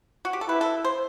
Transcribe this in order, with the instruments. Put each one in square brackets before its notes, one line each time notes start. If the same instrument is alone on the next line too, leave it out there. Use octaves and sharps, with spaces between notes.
[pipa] F#4
G4
A4
[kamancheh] E4 [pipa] B4
[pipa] A4
C5